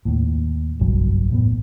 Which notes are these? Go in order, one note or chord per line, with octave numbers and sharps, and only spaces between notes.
D#2 A2
F#1 B1 G2 F#3
E1 A2 B3